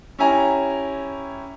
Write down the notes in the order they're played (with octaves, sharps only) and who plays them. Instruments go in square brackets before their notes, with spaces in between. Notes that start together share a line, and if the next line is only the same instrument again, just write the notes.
[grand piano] C#4 E4 G4 G#5 A#5